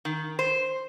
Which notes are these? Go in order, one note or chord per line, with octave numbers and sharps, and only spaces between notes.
D#3
C5